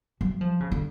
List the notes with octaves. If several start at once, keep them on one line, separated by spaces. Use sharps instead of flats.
F#3
F3
C#3
D3